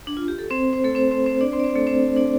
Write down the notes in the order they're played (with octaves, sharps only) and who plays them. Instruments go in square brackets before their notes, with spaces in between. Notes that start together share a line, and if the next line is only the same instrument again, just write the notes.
[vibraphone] D4
F4
G4
A4
C4 C5
C4 C5
A3 A4
C4 C5
C4 C5
C4 C5
D4 D5
C4 C5
D5
C4 C5
A3 A4
C4 C5
D4 D5